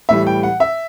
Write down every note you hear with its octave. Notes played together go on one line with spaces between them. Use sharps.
A2 E3 G3 E5
G5
F#5
E5